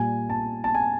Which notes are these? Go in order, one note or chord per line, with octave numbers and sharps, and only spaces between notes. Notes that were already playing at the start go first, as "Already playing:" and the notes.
Already playing: A#2 G3 G#5
A5
A5
G#5